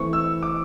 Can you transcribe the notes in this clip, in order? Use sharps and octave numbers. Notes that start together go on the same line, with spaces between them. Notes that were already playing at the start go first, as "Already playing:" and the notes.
Already playing: E3 A3 C4 C#6
E6
D6